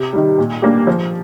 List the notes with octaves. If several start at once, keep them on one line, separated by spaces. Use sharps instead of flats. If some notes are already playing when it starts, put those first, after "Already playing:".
Already playing: C3
D#3 G3
A#2
G3 A#3 D4 G4
F3